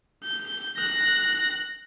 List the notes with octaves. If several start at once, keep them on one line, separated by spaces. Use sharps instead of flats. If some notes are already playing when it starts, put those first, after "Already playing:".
G6
F#6 A#6